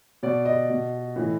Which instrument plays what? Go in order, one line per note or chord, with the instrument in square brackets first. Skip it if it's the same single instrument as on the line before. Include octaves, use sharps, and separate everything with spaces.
[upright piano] B2 D5
D#5
B2
A2 E3